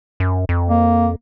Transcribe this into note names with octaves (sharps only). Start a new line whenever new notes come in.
F#2
F2
A#3